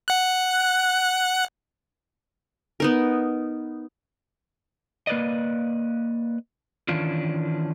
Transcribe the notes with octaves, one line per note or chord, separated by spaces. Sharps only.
F#5 F#6
B3 D#4 A#4
A#3 B4 D5 D#5
D#3 E3 C#4 D4 F4